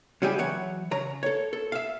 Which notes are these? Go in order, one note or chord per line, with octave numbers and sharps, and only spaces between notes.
C#3 F#3 G3 E4 G4 G#4
E3 F#3 C#5 F#5
C#3 C#5 A#5
A4 C#5
A4
E5 F5